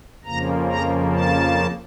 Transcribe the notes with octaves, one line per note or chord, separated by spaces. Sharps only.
F2 C#3 F3 A#3 A#5
A#5
A5